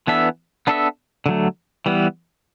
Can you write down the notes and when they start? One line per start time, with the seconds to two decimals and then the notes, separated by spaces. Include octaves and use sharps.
0.07 E3 B3 D4 A4 E5
0.67 B3 D4 A4 E5
1.26 D3 F#3 A3
1.86 E3 G3 B3